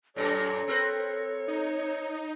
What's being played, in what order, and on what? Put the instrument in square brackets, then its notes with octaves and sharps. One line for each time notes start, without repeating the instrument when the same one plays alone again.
[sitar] F#2 A#2 [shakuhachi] A4 [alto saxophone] C#5
[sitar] C4 A#4 B4
[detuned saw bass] D#4